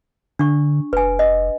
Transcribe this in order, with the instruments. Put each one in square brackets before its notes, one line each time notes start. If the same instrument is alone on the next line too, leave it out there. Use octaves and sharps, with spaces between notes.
[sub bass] D3 [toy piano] D4 C#6
[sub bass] F1 [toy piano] B4 G#5
[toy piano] D#5